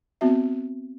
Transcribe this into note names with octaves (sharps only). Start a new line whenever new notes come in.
B3 C4 F#4 E5